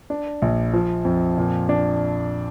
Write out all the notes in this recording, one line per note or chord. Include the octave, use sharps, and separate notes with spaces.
D4
A#1
F3
F2
A#2
D4